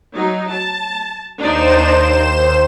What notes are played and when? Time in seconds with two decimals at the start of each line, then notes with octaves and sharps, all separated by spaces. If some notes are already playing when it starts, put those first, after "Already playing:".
0.15 F#3 D#4
0.52 A5
1.40 D#2 D4 D#4 C5 D5 E7